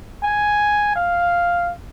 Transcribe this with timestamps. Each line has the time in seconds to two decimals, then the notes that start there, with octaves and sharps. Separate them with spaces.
0.23 G#5
0.96 F5